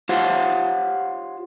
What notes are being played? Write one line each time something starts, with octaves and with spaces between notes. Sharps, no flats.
F4 G4 C5 C#5 F5 F#5